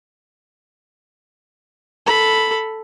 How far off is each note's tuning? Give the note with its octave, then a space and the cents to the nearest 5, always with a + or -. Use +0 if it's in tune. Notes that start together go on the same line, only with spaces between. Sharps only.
A4 +0 B5 +0